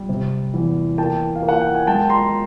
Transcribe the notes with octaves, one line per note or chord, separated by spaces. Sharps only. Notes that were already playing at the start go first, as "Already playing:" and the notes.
Already playing: G3
C3
E2
A#3 G5 A5
F5
A#3
F#5
G5
G#5
G#3 G5 A5
A#5 C6